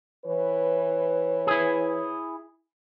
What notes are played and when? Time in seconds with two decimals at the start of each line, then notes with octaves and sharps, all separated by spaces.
0.25 E3 B4 C#5
1.47 E4 G#4